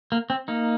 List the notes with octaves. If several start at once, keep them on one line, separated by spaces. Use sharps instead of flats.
A#3
C4
A#3 D#4